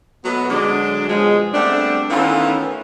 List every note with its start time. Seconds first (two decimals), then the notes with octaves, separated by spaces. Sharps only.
0.24 B2 F#3 A3 B3
0.50 D3 F#3 G#3 D4
1.08 B2 F3 F#3 G#3
1.53 G3 A3 B3 C4 D4
2.10 D#3 E3 A3 B3 C#4 F4